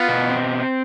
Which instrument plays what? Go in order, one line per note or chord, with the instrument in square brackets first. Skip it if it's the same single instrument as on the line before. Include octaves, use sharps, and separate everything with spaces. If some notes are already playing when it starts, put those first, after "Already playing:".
Already playing: [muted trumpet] B3 [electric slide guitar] F4
[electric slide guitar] B2
C4